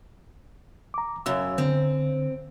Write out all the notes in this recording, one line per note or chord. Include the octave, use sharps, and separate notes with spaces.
A#5 D6
F#2 C#3 E6
D3 C4